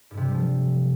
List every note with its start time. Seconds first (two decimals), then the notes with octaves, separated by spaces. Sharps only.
0.11 G2
0.17 C3
0.24 G3
0.31 F3